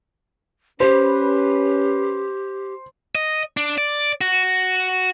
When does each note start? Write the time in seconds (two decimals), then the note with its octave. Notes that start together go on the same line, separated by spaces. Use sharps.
0.80 C#4 G4 B4 C5
3.15 D#5
3.57 D4
3.78 D5
4.21 F#4